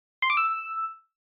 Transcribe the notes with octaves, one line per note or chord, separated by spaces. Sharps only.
C6
D6
E6